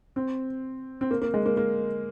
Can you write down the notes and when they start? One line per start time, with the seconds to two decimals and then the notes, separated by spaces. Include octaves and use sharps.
0.16 C4
1.01 C4
1.11 A#3
1.22 A#3
1.34 G#3
1.46 A#3
1.57 A#3